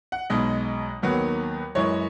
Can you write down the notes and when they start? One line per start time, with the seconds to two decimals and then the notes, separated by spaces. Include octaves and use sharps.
0.12 F#5
0.30 B1 B2 G#3 D#5
1.02 D#2 D#3 F#3 B3
1.75 F#2 E3 G#3 C#5